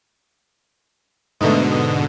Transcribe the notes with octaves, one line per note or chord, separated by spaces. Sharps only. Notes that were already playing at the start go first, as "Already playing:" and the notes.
G#2 B2 D3 A3 B3 D#4
B3